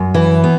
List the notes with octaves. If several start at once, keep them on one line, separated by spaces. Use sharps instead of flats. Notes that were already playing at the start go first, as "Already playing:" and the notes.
Already playing: F#2
E3
B3